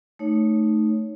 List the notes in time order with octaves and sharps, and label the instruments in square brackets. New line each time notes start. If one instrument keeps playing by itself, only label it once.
[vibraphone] A3 D#4 C#5